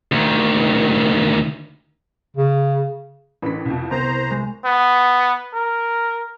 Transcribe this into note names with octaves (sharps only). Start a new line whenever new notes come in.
D2 D#3
C#3
A1 D3 B4 B6
C2 F2
C2 B3 C5 A#5
G#3
B3
A#4